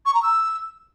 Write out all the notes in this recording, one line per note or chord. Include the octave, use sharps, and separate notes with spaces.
C#6
A#5
E6